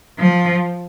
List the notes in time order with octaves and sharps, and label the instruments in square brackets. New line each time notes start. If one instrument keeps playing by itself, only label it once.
[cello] F3